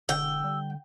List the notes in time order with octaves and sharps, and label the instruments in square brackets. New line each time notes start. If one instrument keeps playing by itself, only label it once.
[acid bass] E1 [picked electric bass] D3 [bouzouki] G5 [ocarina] E6
[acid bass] G3